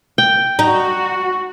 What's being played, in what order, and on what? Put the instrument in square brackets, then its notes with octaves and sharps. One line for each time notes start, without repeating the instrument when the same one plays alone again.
[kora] G5
[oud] D#4 [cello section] F#4